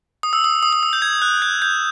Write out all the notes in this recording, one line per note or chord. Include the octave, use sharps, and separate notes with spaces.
D#6
E6
D#6
D#6
D#6
E6
G6
G#6
F#6
G6
G6